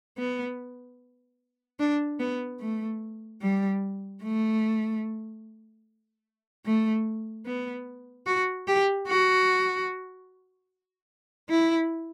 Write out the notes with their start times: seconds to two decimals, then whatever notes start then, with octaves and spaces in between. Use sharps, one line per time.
0.18 B3
1.79 D4
2.20 B3
2.60 A3
3.42 G3
4.23 A3
6.65 A3
7.46 B3
8.27 F#4
8.67 G4
9.08 F#4
11.50 E4